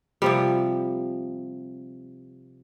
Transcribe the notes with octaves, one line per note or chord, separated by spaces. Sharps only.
C3 F3 G3